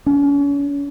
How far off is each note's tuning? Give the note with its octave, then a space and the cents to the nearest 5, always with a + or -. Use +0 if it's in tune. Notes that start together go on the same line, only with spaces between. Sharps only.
C#4 +35